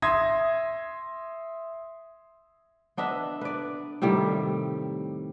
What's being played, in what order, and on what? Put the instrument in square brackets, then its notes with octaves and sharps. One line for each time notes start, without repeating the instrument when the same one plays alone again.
[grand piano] E5 C6 D#6 G#6 A#6
[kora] B3 D4 D#5 E5
B4 D5
A2 C3 D#3 G3